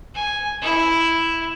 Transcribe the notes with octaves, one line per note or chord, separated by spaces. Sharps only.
G#5
E4